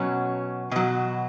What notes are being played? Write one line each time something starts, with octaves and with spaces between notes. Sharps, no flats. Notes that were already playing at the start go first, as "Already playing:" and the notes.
Already playing: B2 F#3 C#4
B2 F#3